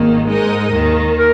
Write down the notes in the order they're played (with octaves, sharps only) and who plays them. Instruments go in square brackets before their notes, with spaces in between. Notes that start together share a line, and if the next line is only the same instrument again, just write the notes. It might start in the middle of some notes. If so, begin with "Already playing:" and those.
Already playing: [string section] G#1 D#3 A#3
G#2 G#3 D#4 A#4 D#5
D#2 D#3 A#3
[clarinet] A#4